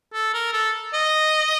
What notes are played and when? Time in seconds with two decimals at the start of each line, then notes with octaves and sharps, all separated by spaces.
0.13 A4
0.34 A#4
0.53 A4
0.93 D#5